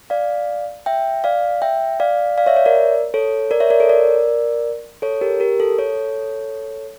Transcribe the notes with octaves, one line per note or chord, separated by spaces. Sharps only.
D5 F5
E5 G5
D5 F5
E5 G5
D5 F5
D5 F5
C#5 E5
C#5 E5
A#4 D5
A4 C#5
A#4 D5
C#5 E5
A#4 D5
A4 C#5
A#4 D5
A4 C#5
G4 A#4
G4 A#4
A4
A4 C#5